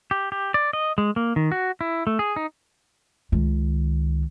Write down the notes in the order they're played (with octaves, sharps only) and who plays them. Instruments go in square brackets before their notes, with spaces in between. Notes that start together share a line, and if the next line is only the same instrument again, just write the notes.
[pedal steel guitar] G4
G4
D5
D#5
G#3
A#3
D#3
F#4
E4
A3
G#4
D#4
[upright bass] C#2 D#3